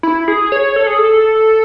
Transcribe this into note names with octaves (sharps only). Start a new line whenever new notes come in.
E4
G#4
C#5
A4
G#4
A4